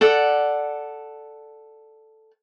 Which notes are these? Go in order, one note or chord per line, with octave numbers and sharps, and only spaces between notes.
A4 D5 F#5